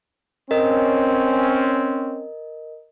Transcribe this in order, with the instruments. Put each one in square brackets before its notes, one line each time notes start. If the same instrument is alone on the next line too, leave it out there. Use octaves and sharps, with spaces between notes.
[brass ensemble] C4 C#4 [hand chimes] A#4 D#5